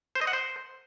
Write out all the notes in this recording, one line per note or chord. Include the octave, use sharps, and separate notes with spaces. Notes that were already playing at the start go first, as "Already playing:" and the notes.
C5
D#5
F#5
C5